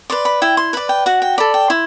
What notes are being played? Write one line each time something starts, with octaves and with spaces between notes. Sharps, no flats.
B4 D5 C6
B5
E4 G5
C6
B4 D5 B5
G5
F#4 F#5
G5
A4 D5 B5
G5
E4 C6